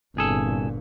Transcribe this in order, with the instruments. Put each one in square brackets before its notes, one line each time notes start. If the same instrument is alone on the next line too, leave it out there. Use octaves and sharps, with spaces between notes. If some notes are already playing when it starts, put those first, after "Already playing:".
[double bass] G1 A#2 [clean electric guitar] C2 G#4 A4